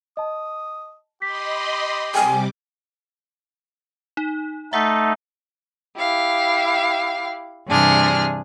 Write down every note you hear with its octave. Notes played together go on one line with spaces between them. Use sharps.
D#5 A5 D#6
G4 D#5 B5 C6 B6
C3 G3 G5 G#5 D6 F6
D#4
A3 D#4 E5 F#5
E4 G4 F5
G2 C3 E3 D4 G#4 F6